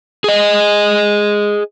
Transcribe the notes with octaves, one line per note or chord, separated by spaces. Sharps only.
G#4 D#5